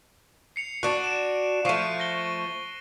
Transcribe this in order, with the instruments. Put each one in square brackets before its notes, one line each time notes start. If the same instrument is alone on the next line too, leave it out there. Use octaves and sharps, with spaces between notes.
[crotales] C7 C#7 F7
[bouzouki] D4 F#4 [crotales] F#6
[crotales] D7 E7
[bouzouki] F3 A3 [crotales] C#6 C7 D#7
[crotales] A#6 G7